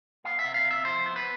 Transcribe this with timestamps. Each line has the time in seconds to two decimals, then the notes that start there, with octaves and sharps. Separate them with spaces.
0.24 B3 F5
0.39 E5
0.44 C3
0.54 F5
0.65 C3
0.71 E5
0.85 F3 C5
1.06 B3
1.16 B4